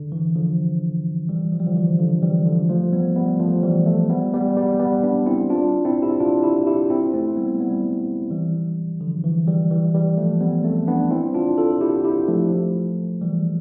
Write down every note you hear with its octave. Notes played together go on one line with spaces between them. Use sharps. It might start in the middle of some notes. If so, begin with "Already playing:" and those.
Already playing: D3
E3
D3 F3
E3 G3
F3
G3
D3 F3
E3
D3 F3
E3 G3
D3 F3
F3 A3
G3 B3
G3 B3
F3 A3
E3 G3
F3 A3
G3 B3
G3 B3
G3 B3
G3 B3
B3 D4
C4 E4
D4 F4
C4 E4
E4 G4
D4 F4
E4 G4
E4 G4
C4 E4
A3 C4
G3 B3
G3 B3
E3 G3
D3 F3
E3
E3 G3
E3 G3
E3 G3
F3 A3
G3 B3
A3 C4
B3 D4
C4 E4
D4 F4
F4 A4
E4 G4
E4 G4
F3 A3
E3 G3